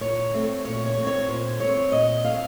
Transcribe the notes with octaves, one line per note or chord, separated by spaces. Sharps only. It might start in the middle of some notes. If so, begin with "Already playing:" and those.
A#2 C#5
A3 C4
A#2 C#5
C#5
A3 C4
C#5
A#2 C5
A3 C4 C#5
A#2 D#5
A3 C4 F5